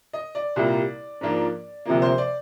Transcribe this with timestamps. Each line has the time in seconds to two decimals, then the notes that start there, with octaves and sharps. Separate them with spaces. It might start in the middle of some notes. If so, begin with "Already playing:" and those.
0.13 D#5
0.35 D5
0.56 C2 A#2 G3 A#3
1.21 G#2 F3 A#3 D4 F4
1.85 D2 C3 F3 A#3
2.02 C5
2.18 D5